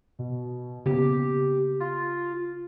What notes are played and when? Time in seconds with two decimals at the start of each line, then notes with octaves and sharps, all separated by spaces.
0.19 B2
0.86 C#3 A#3 B3 G4
1.80 F4